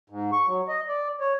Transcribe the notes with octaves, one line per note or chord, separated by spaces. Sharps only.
G#2
C#6
F#3
D#5
D5
C#5